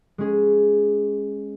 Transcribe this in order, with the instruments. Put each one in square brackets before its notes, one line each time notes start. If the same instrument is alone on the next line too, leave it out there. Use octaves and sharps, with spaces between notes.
[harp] G#3 C#4 G#4